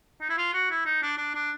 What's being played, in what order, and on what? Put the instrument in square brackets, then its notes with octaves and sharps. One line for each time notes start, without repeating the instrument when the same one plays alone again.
[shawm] D#4
E4
F4
F#4
E4
D#4
D4
D4
D4